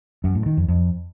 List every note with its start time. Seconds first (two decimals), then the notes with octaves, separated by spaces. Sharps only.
0.24 F#2
0.35 A2
0.46 D#3
0.57 F2
0.68 F2